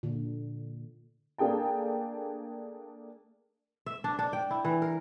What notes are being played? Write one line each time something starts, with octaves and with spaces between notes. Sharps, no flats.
A#2 D3
A3 A#3 D4 G#4 G5 A5
E5
D4
D4
G5
E4
E3
A#4